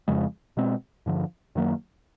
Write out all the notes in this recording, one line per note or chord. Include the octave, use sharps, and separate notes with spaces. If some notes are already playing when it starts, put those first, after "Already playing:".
F2 C#3 F3 G#3
B2 G#3 C4
G2 D3 F3
F#2 D#3 F#3 A#3